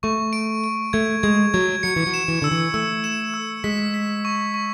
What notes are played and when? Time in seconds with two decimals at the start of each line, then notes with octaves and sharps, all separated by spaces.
0.03 A3 C#6
0.33 D7
0.64 D7
0.93 A3 G#6
1.23 G#3 G#6
1.54 F#3 G#6
1.83 F#3 C#7
1.96 E3
2.07 F#3
2.14 E7
2.28 E3
2.42 D3 E6
2.52 E3
2.74 A3 E6
3.04 E7
3.34 E6
3.64 G#3 B6
3.94 B6
4.25 C#6
4.54 C#6